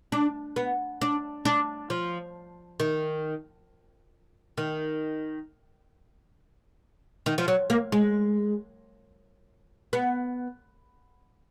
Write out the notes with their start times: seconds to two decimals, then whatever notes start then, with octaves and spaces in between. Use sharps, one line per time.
0.12 D4
0.56 B3
1.01 D4
1.45 D4
1.90 F3
2.80 D#3
4.58 D#3
7.26 D#3
7.38 F3
7.48 F#3
7.70 A#3
7.92 G#3
9.93 B3